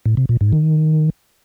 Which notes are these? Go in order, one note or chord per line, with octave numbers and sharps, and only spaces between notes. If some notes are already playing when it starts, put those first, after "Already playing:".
A2
C3
A#2
G#2
D#3